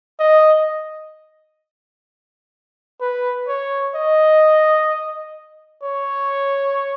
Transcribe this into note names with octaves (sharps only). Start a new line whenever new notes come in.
D#5
B4
C#5
D#5
C#5